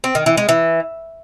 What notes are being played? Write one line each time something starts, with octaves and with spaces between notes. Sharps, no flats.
C4
D#3
E3
G#3
E3